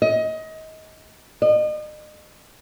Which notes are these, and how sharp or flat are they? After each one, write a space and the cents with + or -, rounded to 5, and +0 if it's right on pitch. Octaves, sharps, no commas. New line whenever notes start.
D#5 +25
D#5 -40